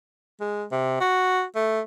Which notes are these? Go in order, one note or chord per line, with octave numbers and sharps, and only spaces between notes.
G#3
C3
F#4
A3